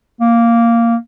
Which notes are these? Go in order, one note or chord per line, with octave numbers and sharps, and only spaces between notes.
A#3